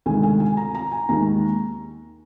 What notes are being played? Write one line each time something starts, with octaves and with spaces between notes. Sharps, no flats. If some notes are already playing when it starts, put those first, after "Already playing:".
D2 C3 D#3 G#3 G#5
G#5
G#5
A#5
A#5
G#5
D#2 D#3 G#3 A#5